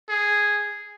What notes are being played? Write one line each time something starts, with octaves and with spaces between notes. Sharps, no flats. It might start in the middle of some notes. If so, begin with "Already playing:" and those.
G#4